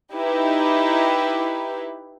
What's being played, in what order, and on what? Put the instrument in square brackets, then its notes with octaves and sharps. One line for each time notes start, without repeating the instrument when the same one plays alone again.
[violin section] D#4 E4 G4 B4